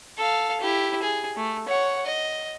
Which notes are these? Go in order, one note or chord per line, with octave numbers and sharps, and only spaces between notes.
A4 F5
E4 G4
G#4
A3
C#5 F#5
D#5